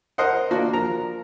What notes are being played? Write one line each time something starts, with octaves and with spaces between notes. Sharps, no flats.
A#4 C5 D#5 F#5
A#3 D4 F#4
F3 A#4 A#5